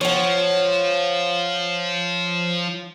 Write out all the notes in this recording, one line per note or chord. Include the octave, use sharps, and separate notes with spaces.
F3 C#5 F#5